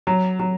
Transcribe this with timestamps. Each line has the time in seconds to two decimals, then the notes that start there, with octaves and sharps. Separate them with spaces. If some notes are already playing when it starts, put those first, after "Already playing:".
0.07 F#3
0.39 F#3